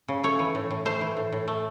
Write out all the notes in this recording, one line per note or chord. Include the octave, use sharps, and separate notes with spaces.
C#3
A3 C#5
E3
A2
A2
A3 C5
E3
A2
A2
A3